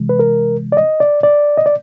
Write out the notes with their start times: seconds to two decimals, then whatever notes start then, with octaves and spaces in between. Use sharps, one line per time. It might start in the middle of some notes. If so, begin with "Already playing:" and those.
Already playing: C3 E3 G#3
0.09 B4
0.19 A#4
0.72 D5
0.77 D#5
1.00 D5
1.23 D5
1.57 D#5
1.66 D5